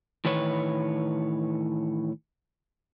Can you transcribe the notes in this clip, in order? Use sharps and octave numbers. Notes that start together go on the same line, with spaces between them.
A2 D#3 E3 B4 C#5